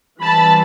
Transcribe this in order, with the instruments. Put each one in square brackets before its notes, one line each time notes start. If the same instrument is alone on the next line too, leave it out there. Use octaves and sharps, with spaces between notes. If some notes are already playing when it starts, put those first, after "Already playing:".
[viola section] E3 G3 C4 A5 B5